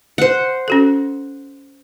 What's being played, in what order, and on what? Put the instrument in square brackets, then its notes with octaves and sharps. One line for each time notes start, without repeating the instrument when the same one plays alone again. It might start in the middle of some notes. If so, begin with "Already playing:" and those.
[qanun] C5 F#5
[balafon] C#4 F#4 A4